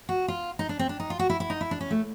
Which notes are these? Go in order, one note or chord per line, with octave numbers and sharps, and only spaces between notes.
F#4
F4
D#4
D4
C4
D4
D#4
F4
F#4
E4
E4
D#4
E4
D4
C#4
A3